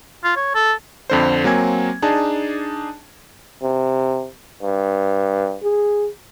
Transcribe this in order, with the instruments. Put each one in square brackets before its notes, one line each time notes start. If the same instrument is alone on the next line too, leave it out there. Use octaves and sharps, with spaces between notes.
[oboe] F4
C#5
A4
[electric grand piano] F2 D3 C5
F#3 A#3 C4 G#5 G#6
D4 D#4 G#4 A5
[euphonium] C3
G2
G#4